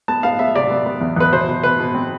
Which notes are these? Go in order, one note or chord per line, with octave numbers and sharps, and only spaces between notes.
B3 A5
B3 F5
B3 E5
C3 D5
B3
B3
E2
E2 B4
B2 C5
B2
B2 B4
B2
C4